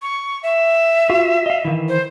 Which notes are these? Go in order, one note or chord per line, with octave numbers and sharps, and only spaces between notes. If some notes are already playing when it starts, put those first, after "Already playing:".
C#6
E5
F4 F#4 F5
D#5 F5
D#3 E3
C5